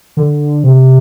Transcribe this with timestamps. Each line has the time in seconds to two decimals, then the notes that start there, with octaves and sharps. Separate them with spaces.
0.17 D3
0.63 C3